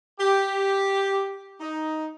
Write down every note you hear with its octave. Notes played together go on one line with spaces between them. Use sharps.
G4
D#4